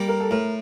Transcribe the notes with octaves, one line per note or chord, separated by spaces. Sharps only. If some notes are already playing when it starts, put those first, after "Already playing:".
Already playing: G3 A#3
A#4
A4
A2 A#4